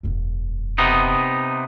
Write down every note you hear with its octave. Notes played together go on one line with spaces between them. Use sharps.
E1 F#2
C3 B3 D#4